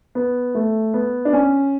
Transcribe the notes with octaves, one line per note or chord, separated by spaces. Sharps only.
B3
A3
B3
D4
C#4